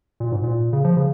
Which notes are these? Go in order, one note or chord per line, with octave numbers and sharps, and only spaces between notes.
A#2
G#2
A#2
C#3
F3
C#3